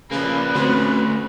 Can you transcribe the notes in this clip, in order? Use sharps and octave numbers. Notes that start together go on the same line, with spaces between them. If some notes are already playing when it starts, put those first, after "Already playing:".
C#3 F3 A#3 B4
D3 A3 C4 C#4 F#4 C5